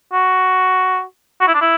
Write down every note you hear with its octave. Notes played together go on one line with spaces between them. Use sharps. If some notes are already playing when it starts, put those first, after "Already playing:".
F#4
F#4
E4
D4
E4